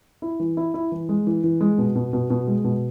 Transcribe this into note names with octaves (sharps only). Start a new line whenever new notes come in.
E4
E3
E4
E4
E3
G#3
E3
E3
G#3
B2
B2
B2
B2
G#3
B2